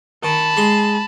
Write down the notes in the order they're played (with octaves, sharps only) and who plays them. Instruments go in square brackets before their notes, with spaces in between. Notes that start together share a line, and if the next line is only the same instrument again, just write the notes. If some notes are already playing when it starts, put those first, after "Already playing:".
[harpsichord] D#3 [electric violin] A5 B5
[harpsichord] G#3 C6